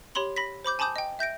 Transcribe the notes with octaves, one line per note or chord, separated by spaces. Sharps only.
G4 C#5 B5 C6 F#7
B5 A#6 B6
C5 B5 D6 G6
G#5 A5 B5 D6 D#6 G6
D#5 G5
E5 G6 A#6 D7